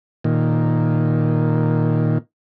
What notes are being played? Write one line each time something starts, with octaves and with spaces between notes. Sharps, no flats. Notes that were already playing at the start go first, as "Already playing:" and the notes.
A#2 D#3